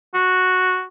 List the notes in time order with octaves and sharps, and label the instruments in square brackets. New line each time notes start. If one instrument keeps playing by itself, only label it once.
[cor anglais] F#4